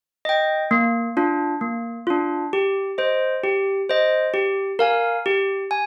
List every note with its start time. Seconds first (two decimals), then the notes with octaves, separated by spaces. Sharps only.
0.25 D#5 G5
0.71 A#3
1.17 D4 F4
1.61 A#3
2.07 D4 F4
2.53 G4
2.98 C5 D#5
3.44 G4
3.89 C5 D#5
4.34 G4
4.79 A#4 F5 G#5
5.26 G4
5.71 G#5